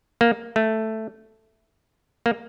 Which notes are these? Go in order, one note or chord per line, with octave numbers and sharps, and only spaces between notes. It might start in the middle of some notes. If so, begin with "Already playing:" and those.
A#3
A3
A#3